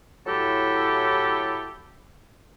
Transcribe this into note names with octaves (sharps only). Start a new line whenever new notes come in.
A2 F#3 E4 G4 A4